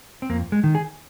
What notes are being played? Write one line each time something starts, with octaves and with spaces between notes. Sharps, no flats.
C4
F2 A#3
G#3
D#3
G#4